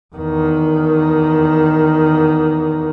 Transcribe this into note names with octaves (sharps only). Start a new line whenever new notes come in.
E2 D#3